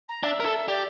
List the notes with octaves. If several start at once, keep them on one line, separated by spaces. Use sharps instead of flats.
A#5
D4 E5
A#4
A4
G4 D5